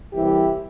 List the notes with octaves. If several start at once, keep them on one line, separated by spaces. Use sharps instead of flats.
C2 C3 E3 E4 G4